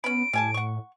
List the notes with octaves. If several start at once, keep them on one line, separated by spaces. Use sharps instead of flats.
B3 C#4 B5 D7
A2 G3 G#5 A5
F#5 C#6